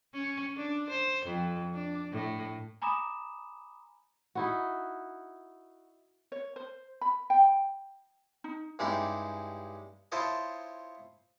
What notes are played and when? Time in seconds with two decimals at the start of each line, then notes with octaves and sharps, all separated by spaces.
0.14 C#4
0.56 D4
0.90 C5
1.26 F2
1.74 D4
2.12 A2
2.82 G#5 A#5 B5 D6 D#6 E7
4.35 D#4 E4 F#4
6.32 C#5
6.56 C5
7.01 B5
7.30 G5
8.44 D#4
8.79 G2 G#3 C#4 D#4 E4 G4
10.12 E4 F4 C5 C#5 D#5 A5